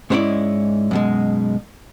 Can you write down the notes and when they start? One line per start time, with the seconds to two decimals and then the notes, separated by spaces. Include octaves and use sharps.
0.10 G#2 G#3 B3 C#4 E4 D5
0.91 F#2 B2 G#3